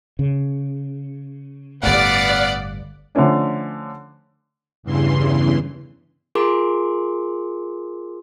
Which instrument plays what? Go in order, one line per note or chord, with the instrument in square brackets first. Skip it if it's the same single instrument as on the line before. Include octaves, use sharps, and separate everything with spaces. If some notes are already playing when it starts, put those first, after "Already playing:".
[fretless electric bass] C#3
[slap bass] G1 A2 [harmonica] B3 F5 F#5 [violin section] D5
[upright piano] D3 F3 A3 C#4 D4
[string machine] E2 G2 C#3 E3 C6
[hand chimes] F4 G#4 A#4 C6 D6